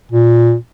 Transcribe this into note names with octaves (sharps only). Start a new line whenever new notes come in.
A#2